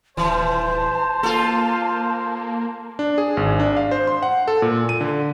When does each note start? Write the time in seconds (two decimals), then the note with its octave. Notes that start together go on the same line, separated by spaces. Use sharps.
0.17 D#1 E3 C5 A5
1.23 A#3 F4 A4
2.99 D4
3.18 G#4
3.37 G#1
3.60 D4
3.76 F5
3.91 C5
4.07 C6
4.23 F#5
4.48 A4
4.62 A#2
4.89 D#7
5.01 D3